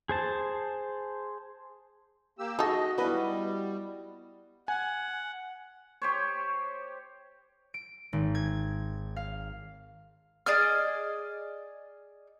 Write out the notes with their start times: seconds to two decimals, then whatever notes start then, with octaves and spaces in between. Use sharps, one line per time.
0.09 G#4 C5 A5
2.39 A#3 G4 E6
2.59 D#4 F#4 G#4 A4 D#5
2.98 G3 B3 E4 F#4 B4 D#5
4.68 F#5 G#5
6.02 G4 C5 C#5
7.74 D7
8.13 G#1
8.35 G#6
9.16 F5
10.46 G#4 D5 D#5 F6